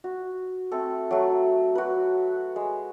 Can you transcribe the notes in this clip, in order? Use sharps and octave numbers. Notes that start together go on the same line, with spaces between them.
F#4
A3 C4 A4
F#3 A3
F#4 B4
G#3